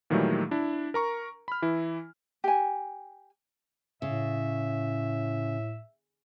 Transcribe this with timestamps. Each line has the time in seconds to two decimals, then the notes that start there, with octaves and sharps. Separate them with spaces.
0.10 A#2 D#3 E3 F#3 G3 A3
0.51 D4 E4
0.94 A#4 A#5 C#6
1.48 B5 F6
1.62 E3 E4
2.44 G4 G#5
4.02 A2 C#3 E5